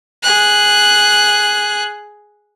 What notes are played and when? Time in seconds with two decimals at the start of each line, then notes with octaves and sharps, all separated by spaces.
0.23 G#4 F#6